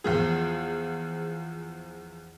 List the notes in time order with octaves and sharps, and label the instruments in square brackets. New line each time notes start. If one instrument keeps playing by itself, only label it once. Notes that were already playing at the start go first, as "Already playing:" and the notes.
[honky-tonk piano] E2 F3 G#4